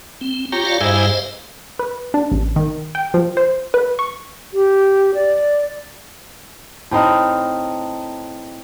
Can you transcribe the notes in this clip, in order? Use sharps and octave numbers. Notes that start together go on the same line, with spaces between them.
C4
F4 G4 C#5 G5 A#5
F4 D5 F5
G2 E4 G#4 C5 D#5 F5
B4
D4
A1
D#3
G5
F3
C5
B4
C#6
G4
D5
A2 C4 D#4 A#4